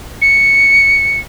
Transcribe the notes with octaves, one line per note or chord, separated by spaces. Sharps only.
C#7